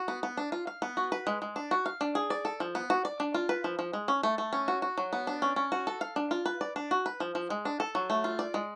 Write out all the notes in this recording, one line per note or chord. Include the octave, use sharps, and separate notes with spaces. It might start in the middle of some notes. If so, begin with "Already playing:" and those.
Already playing: F#4
B3
B3
D4
F4
F5
B3
F#4
B4
G#3
G#3
D4
F#4
F5
D4
G#4
D5
A4
F3
B3
F#4
D5
D4
F4
B4
F3
F3
G#3
C#4
A3
A3
C#4
F#4
F#4
F#3
B3
D4
C#4
C#4
F#4
A4
F5
D4
F4
B4
D5
D4
F#4
B4
F3
F3
G#3
D4
A4
F#3
A3
F4
D5
G#3